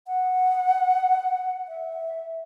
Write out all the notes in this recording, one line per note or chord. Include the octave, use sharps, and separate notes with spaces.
F#5
E5